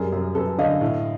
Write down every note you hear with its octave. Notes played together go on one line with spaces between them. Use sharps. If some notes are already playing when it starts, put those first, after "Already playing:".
Already playing: F#2 G3 G#4 A#4
F#2
F#2 A4 B4
D3 D#5 F5
A2